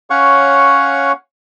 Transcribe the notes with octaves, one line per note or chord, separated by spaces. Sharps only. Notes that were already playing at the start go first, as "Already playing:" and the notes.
C#4 C#5 F5 F#5 C#6